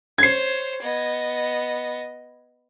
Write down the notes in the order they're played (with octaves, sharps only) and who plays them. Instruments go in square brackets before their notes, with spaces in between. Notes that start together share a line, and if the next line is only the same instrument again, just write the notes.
[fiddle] C5 C#5 [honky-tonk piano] G#6 C7
[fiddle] B3 D#5